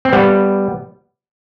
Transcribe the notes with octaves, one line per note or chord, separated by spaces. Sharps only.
C4
G3 B3